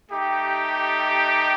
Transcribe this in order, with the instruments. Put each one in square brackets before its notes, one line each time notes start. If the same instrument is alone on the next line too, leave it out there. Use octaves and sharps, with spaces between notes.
[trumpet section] A3 D#4 G4